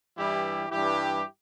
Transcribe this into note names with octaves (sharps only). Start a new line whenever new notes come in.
G2 E3 G3 E4 G4
G2 E3 G3 E4 G4